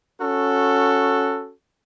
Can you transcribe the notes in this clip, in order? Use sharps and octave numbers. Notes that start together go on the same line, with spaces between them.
C#4 F#4 A4